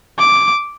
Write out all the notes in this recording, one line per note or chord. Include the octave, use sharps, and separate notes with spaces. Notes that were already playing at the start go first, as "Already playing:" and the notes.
D6